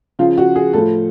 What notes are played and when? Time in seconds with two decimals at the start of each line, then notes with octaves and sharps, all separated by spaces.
0.19 C#3 F3 F4
0.38 F#4
0.56 G#4
0.73 A2 F3 A4